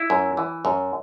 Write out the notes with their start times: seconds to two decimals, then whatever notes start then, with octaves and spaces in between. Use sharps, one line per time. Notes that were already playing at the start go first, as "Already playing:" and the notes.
Already playing: E4
0.10 F#2
0.37 E3
0.65 F#2